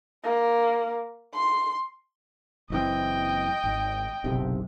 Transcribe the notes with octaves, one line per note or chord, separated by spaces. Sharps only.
A#3
C6
F#1 E3 C4 D#5 G5
G#1
F#1 B1 C3